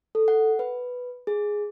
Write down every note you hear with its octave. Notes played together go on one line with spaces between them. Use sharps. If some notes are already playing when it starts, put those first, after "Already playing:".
A4
F#5
B4
G#4